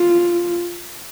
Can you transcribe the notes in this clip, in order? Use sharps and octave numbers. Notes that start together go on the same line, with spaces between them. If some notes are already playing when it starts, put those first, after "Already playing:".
Already playing: F4